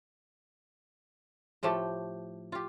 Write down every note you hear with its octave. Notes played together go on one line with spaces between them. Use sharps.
A2 F3 A3 G4
F4 G4